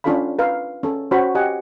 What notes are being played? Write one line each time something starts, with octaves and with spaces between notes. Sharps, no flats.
C#4 D4 F4 A4 F5 B5
A#4 B4 F5
C#4 A4
C#4 F#4 C5 C#5 B5 C#6
G4 D#5 F#5 G#5